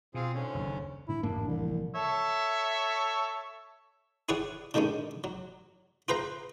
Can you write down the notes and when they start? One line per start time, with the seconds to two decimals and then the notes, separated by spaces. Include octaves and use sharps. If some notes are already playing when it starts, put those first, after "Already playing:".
0.14 B2 C4 F4 G#4
0.34 G#2 D3 C#4
0.55 F#1 D#2
1.09 A2 D3 D4 E4
1.23 A1 F2 G#2 A#3 D4
1.47 C2 C3 E3 F3
1.95 A4 C#5 E5
4.29 E4 G4 G#4 C#5 D5 F#5
4.74 D3 D#3 G3 G#3 C#4
5.24 F#3
6.08 F4 G#4 B4 C5 F5 A#5